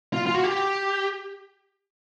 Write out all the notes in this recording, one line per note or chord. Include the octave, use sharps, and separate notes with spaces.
F4
F4
F#4
G4